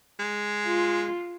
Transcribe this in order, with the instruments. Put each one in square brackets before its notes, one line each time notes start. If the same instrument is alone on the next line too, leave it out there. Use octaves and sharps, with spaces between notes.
[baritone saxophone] G#3
[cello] F4